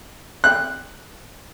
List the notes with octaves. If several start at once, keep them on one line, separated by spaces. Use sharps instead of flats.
F#6